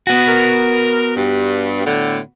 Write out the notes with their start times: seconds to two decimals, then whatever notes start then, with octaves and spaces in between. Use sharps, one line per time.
0.07 B3 F#4
0.28 A#4
1.16 G2
1.85 A2 D3